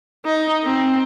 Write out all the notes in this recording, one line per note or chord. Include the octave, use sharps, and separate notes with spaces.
D#4
C4